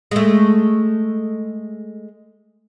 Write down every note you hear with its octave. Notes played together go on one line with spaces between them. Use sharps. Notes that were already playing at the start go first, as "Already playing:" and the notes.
G#3 A3